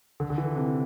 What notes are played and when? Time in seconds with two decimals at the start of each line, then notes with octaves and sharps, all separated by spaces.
0.20 D3
0.30 D3
0.38 E3
0.56 C3